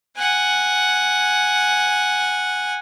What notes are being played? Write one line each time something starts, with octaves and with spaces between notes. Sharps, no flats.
F#5 G#5